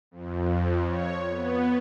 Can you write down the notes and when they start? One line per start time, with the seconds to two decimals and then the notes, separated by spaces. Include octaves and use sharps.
0.11 F2
0.86 C#5
1.30 B3